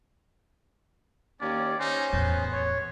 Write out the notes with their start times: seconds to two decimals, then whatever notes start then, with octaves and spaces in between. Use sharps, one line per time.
1.41 D#2 C#4 D5
1.80 C#4 D#4 C5
2.13 E2 A2 B3
2.53 C#5